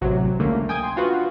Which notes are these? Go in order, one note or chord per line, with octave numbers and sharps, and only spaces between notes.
A1 C3 F#3
C#2 D3 A3 A#3 C#4
G5 G#5 D#6 G6 G#6
C6
D4 F4 F#4 B4